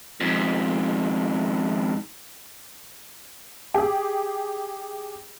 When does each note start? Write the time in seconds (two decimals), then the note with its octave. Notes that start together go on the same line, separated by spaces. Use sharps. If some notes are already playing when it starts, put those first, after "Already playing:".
0.21 F2 G#2
3.74 G4 G#4